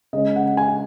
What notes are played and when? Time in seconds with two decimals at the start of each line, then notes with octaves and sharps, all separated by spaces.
0.13 C#3 G#3 C#4 D#5
0.36 F#5
0.57 G#5